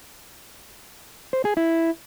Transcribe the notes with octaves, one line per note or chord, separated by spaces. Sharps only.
C5
G#4
E4